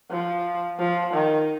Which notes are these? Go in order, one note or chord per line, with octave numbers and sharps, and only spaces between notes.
F3
F3
D#3